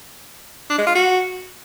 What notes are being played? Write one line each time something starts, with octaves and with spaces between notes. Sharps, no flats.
D4
G#3
F4
F#4